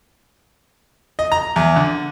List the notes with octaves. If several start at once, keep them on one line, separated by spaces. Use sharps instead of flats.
D#5
A#5
E2
D3